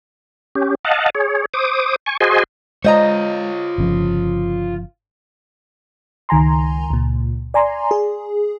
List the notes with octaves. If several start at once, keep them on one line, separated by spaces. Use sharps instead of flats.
C#4 G4
D#5 F5 F#5 A5
G#4 C#5
C5 D6 D#6
G#5 C#6
F#4 G#4 C5 D#5 G#5 C6
G#3 F4 C5 C#5 D#5 A#5
G1 C#3 F3
C#2 D#3 G#5 A#5 C6
C#2 A#2
D5 G#5 A#5 C6
G#4